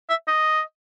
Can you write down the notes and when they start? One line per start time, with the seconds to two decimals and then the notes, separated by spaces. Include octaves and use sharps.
0.10 E5
0.28 D#5